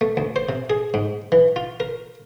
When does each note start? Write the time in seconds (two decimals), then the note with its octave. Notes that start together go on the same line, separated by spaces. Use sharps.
0.01 A3
0.17 D2
0.36 C5
0.49 C3
0.70 G#4
0.94 G#2
1.32 E3
1.56 F4
1.80 A#4